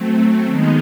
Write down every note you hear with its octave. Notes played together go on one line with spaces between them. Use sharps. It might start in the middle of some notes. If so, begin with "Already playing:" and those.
Already playing: F#3 A3 C4
D#3 G#3 B3 D#4